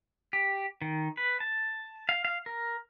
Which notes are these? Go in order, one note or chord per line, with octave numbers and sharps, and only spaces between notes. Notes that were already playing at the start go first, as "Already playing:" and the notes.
G4
D#3
B4
A5
F5
F5
A#4